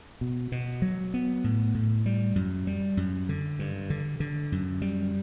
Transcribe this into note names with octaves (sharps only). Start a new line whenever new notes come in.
B2
B2
F#3
B3
A2
A2
G3
F#2
G3
F#2
D3
G2
D3
D3
F#2
G3